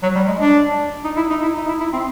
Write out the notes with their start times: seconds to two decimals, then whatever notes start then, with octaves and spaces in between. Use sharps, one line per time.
0.03 F#3
0.15 G3
0.28 G#3
0.41 D4
1.04 D#4
1.17 E4
1.30 D#4
1.42 E4
1.55 D#4
1.68 E4
1.80 E4
1.93 C4